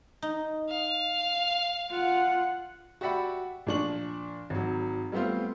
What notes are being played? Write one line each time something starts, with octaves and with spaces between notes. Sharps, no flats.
D#4
F5
F4 F#5
F#4 G4 D5 E5 F#5 B5
A#2 F3 D4 C#6 F#7
G#1 F#3
G3 A3 B3 C4 F4